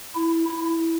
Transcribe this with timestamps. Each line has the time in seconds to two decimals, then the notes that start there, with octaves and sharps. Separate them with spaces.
0.15 E4
0.58 E4